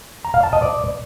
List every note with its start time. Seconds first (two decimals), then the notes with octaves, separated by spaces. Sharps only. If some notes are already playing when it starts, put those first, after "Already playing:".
0.25 A#5
0.34 F5
0.43 A5
0.53 D#5
0.62 D5